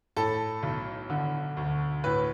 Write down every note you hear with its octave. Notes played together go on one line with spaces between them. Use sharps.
A2 A4
B1
D3
D2
A2 B4